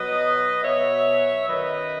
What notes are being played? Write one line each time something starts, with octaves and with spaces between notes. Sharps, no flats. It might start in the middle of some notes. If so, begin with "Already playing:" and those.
Already playing: B2 F#3 B4 D#5
B2 F#3 C#5 E5
F#2 D#3 F#3 B4 D#5